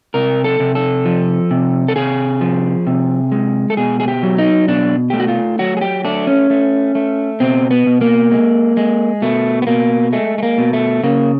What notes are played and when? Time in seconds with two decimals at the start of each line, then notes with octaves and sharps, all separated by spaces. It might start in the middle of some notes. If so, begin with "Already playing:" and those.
0.14 C3 A#4
0.44 A4
0.60 C3
0.75 A4
1.05 F3
1.51 C3
1.88 A4
1.96 C3 G#4
2.41 F3
2.87 C3
3.32 G#3
3.70 A4
3.77 B2 G#4
4.00 G#4
4.08 G4
4.23 F#3
4.38 D#4
4.68 B2 D4
5.10 A3 G4
5.20 F#4
5.28 F4
5.59 F#3 F#4
5.77 G#4
5.81 G4
6.05 A3 D4
6.27 C#4
6.50 A3
6.95 A3
7.40 B2 C4
7.71 B3
7.86 B2
8.01 A#3
8.32 G#3
8.77 G#3
9.22 B2 A3
9.62 B3
9.67 B2 A#3
10.13 G#3 A3
10.38 A3
10.43 A#3
10.58 B2
10.73 A3
11.03 C#3 A#3